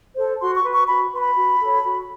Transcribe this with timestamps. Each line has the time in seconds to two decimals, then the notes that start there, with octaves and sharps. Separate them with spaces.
0.15 A4 C5
0.39 F#4 C6
0.55 C#6
0.64 B4
0.72 C#6
0.88 F#4 B5
1.12 B4 C6
1.19 B5
1.35 F#4
1.60 A4 C#5
1.83 F#4